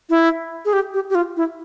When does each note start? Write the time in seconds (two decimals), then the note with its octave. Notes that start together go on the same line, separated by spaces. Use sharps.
0.10 E4
0.65 G#4
0.73 G4
0.94 G4
1.10 G4
1.15 F4
1.37 E4